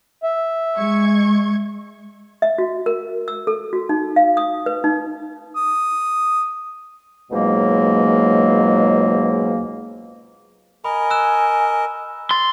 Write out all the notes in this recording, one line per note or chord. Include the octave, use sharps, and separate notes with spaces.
E5
G#3 C#6 G#6
E5
F#4
A#4
E6
A4
F#4
D#4
F5
D#6
B4
D#4
D#6
C#2 G#2 B2 F#3 G#3 A#3
A#4 D#5 G#5 B5
E6 F#6 E7
C6 A6